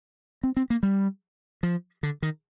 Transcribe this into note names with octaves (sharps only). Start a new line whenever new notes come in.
C4
C4
A#3
G3
F3
D3
D#3